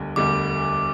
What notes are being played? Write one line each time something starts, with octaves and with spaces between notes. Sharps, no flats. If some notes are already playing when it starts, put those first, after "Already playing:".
Already playing: E1 D2 D3 G3
E1 D2 D3 G3 D6